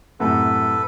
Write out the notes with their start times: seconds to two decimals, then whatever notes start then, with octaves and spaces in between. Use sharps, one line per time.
0.20 F#2 A2 C3 A4 B4